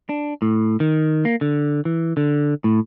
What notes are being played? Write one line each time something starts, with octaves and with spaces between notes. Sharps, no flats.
D4
A2
D#3
A#3
D3
E3
D3
A2